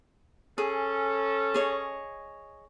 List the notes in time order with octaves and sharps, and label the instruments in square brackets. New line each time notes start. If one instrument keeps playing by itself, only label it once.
[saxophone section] C#4 A4 [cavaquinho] G#4
[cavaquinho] G#4 C#5 D#5